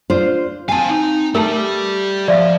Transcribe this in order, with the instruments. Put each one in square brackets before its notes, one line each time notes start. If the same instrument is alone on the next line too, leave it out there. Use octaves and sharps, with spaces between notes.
[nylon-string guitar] D4 F4 C5
[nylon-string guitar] C4 G#5 [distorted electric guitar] F5 A5
[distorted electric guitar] D#4
[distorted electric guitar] G3 G4 [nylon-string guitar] A3 [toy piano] A#4 A5
[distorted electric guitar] F3 [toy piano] D5 E5 F5